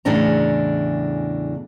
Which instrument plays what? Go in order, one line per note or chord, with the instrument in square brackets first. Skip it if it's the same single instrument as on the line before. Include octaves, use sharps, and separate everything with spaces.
[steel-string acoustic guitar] E2 A2 C#3 D4 D#5 A#5